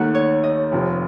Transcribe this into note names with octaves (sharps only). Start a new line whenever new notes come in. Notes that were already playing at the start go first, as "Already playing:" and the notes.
Already playing: D#2 D#3 A3 F#5
C#5
D#5
F1 F2 C3 F3